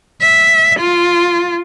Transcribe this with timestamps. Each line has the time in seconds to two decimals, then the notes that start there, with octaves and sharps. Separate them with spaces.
0.21 E5
0.80 F4